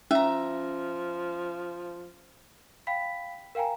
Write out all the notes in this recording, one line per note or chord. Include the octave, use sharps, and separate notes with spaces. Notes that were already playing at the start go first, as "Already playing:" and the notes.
F3 C#4 E5 A#5
F5 G5 B5 B6
A#4 F5 G5 G#5 A#5